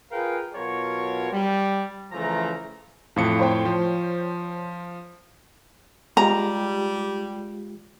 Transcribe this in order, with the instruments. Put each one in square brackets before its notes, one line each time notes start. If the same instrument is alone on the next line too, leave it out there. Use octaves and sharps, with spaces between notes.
[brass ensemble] F4 G#4 A#4 B4 F5 G5
B2 F#3 F4 A#4 C#5
G3
C#3 E3 F3 A3 A#5
[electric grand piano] F2 A2 C#7 [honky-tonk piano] F3
[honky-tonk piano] C5 C#5 G5
[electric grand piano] F3
[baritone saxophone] G3 [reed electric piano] G#3 F4 G4 [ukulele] A#5